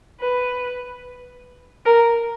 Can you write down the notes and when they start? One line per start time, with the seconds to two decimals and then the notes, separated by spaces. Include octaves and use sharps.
0.20 B4
1.85 A#4